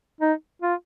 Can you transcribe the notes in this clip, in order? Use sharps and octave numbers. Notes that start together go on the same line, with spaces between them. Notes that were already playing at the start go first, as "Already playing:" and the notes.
D#4
F4